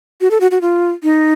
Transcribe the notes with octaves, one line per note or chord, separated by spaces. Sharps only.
F#4
A4
F#4
F#4
F4
D#4